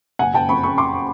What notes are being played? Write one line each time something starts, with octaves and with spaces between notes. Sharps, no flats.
F#1 F#5 G#5
F#1 G5 A5
F2 B5 C#6
C#3 B5 C#6
F#1 C6 D6